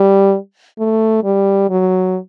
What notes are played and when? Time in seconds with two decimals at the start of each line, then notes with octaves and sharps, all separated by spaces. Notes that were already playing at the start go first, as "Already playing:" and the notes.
Already playing: G3
0.79 A3
1.24 G3
1.70 F#3